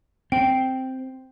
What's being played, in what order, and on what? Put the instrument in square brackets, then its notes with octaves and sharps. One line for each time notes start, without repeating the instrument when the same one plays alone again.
[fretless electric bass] C4 [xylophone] G5